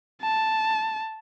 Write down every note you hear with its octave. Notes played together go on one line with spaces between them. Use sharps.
A5